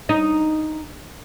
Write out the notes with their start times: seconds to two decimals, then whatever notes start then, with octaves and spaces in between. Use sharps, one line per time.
0.09 D#4